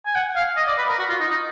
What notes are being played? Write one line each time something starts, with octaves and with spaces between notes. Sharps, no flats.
G#5
F#5
F5
D#5
D5
B4
A#4
F#4
F4
D#4
D#4